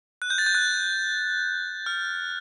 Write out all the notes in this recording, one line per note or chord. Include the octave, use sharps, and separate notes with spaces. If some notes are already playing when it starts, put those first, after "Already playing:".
F#6
G6
A6
G6
F#6
F6